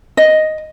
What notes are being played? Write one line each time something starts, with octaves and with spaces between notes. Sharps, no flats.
D#5